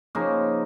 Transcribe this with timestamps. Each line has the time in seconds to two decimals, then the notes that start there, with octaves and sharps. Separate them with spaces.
0.15 C#3 F3 A#3 D#4